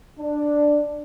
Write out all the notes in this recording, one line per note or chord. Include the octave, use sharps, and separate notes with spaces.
D4